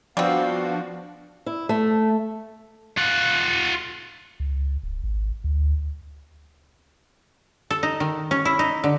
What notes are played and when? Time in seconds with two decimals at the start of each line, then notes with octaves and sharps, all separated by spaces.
0.17 F3 G3 B3 C4 D4 F#4 F5
1.46 E4
1.69 A3
2.98 F4 F#5
4.40 C#2
4.83 D1
5.04 G#1
5.44 D2
7.71 A4
7.83 D#4
8.00 D#3
8.31 C#4
8.45 E4
8.59 D#4
8.84 D3